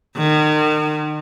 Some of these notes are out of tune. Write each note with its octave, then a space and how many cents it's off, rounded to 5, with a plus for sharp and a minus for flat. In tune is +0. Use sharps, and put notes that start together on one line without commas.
D#3 -35